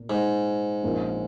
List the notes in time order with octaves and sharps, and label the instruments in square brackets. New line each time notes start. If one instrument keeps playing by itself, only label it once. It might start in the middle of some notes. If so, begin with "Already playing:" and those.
Already playing: [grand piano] A#2 A#3
[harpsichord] G#2
[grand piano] A#1 A#2 A#3 C#4